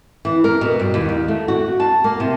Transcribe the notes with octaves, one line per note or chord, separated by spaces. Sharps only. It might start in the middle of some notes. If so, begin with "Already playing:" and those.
E3
A#4
B2
G2
D#2
D#2
A3
F#4
A5
A#3
C3